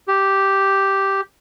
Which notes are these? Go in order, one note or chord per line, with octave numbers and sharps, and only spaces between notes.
G4